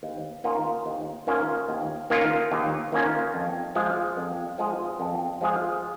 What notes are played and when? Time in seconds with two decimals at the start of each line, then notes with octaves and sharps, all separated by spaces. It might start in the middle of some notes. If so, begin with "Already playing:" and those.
0.03 D#2
0.44 D#3 A#3 C#4 F4
0.86 D#2
1.27 D#3 A#3 C#4 F4
1.68 D#2
2.10 D#3 A#3 C#4 F4
2.52 D#2
2.92 D#3 A#3 C#4 F4
3.34 F2
3.75 F3 G#3 F4 G#4
4.17 F2
4.58 F3 G#3 F4 G#4
5.00 F2
5.41 F3 G#3 F4 G#4